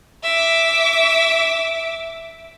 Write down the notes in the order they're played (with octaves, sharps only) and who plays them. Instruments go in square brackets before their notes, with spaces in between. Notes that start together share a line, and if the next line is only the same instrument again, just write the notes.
[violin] E5 D6